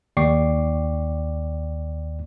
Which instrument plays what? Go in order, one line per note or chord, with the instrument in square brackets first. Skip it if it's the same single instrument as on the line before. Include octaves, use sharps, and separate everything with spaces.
[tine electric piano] D#2 D5 G5 C#6 D6 C7